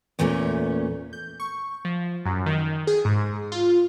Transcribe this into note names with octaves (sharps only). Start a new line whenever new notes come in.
E2 A#2 E3 A3 B3 C#4
G6
C#6
F3
F#2
D#3
G#4
G#2
F4